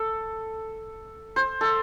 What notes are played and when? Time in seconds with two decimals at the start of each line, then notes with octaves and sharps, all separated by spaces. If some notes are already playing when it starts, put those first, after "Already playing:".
Already playing: A4
1.36 C5
1.61 A4